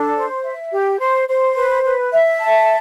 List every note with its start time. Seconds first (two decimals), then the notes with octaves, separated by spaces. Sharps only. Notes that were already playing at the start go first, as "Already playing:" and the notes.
Already playing: D4 A4
0.16 C5
0.44 E5
0.72 G4
1.00 C5
1.28 C5
1.56 B4
1.84 B4
2.12 E5
2.40 A5